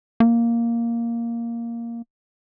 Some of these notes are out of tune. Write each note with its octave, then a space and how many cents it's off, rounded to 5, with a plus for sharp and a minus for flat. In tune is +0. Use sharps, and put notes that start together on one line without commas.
A#3 +0